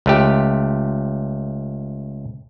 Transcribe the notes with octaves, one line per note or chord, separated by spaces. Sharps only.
C#2 A3 G4